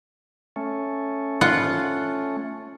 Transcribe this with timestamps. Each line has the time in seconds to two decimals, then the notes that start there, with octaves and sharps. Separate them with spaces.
0.56 A3 C#4
1.41 F4 F#5